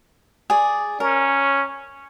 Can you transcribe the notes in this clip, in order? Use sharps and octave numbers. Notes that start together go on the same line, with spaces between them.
G#4 D5
C#4 A#4